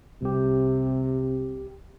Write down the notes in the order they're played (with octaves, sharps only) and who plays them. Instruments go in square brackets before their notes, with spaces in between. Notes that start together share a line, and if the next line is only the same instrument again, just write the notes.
[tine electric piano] C2 G4 [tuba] C3